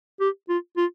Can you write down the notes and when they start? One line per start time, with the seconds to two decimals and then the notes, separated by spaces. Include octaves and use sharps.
0.20 G4
0.49 F4
0.77 F4